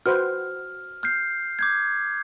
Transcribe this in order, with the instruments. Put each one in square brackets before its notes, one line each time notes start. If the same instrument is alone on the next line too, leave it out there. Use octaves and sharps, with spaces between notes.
[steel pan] F#4 B4 C5 [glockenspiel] F6
[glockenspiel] F6 G6 C7
D6 G6 G#6